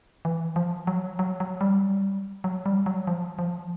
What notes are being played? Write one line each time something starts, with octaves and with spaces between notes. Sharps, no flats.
E3
F3
F#3
F#3
F#3
G3
F#3
G3
F#3
F3
F3